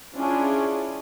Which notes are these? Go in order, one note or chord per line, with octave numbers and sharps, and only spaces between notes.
C#4 D4 E4 F4 G#4 C#5